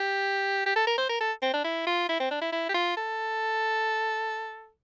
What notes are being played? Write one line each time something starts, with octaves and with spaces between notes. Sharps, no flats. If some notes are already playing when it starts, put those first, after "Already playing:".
Already playing: G4
G4
A4
A#4
C5
A#4
A4
C4
D4
E4
F4
E4
C4
D4
E4
E4
G4
F4
A4